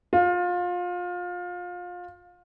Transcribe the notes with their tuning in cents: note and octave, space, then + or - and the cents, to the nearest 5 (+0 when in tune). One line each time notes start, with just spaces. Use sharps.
F4 +25